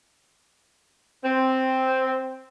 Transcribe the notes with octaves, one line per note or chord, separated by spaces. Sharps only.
C4